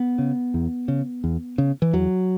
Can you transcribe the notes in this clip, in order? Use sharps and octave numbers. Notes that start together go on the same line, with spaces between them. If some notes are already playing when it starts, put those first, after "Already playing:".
Already playing: B3
C#3
E2
C#3
E2
C#3
E3
E2 F#3